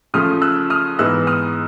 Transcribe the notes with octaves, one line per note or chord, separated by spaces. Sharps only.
C#3 F3 A3 D#6 F6
E6 F#6
D#6 F6
G#2 E3 G#3 B3 D#4 E6 F#6
D#6 F6